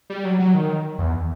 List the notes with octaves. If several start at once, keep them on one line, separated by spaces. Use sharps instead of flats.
G3
F#3
F#3
D#3
E2